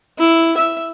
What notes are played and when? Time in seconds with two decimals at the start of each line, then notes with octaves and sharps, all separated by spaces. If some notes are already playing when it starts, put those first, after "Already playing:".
0.19 E4
0.57 E5